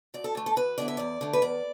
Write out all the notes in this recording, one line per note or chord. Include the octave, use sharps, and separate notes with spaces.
D2 D5
A4
D3 A3
A4
D2 B4
D3 B3 E4 D5
E5
E2 D5
D3 A3
B4
E2 D5